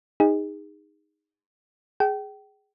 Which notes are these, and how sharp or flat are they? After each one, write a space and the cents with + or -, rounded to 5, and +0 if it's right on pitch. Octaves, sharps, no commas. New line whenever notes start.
D#4 +0 G#4 -30
G#4 +0 G5 -30